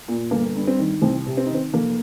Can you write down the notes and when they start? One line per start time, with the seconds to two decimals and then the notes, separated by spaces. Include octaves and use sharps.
0.08 A#2
0.31 G1 A#3
0.56 G2
0.67 C4
0.78 D#3
1.02 C2 C4
1.26 C3
1.37 C4
1.46 D#4
1.49 D#3
1.54 C4
1.73 F1 A#3